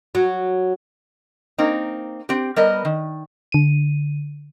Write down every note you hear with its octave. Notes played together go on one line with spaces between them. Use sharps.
F#3
A#3 C4 D#4
C4 G4
G3 B3 A#4 D#5
D#3
D3 D#7